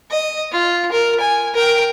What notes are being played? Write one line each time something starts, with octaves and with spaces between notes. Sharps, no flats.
D#5
F4
A#4
G#5
A#4 G5